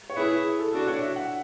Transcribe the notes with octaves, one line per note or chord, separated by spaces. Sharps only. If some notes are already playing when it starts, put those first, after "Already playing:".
C#5
E4 G#4 B4
A4
D4 F#4 A4
C#5
E5
F#5